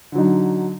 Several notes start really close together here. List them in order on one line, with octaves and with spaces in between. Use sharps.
D3 F#3 D#4